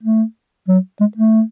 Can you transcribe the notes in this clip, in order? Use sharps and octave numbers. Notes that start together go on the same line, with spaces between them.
A3
F#3
G#3
A3